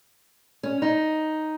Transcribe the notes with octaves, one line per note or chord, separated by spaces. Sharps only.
C#4
D#4